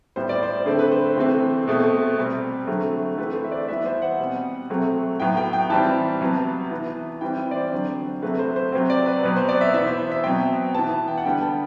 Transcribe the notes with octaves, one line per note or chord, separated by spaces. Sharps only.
A2 G3 B3 C5
D5
C5
D3 A3 C4 C5
B4
C5
C3 E3 A3 C4
B2 A3 C4
C3 G3 C4
D3 F#3 A3 C4
E3 A3 C4 B4
C5
E5
D5
E3 G3 B3 E5
C5
F#5
B2 G3 C4
C3 F#3 A3 C4
A2 F#3 B3 G5
G5
G5
E3 G3 C4 A5
C3 F#3 B3
E3 B3
E3 G3 C4 G5
D5
C5
D3 F#3 C4
C3 F#3 A3 B4
C5
C5
C3 F#3 C4 C5
D5
B4
B2 F#3 C4 B4
C5
D5
E5
E3 B3 E5
C5
C5
E5
B2 F#3 C4 G5
E3 B3 A5
A5
G5
F#5
D3 G3 B3 G5
A5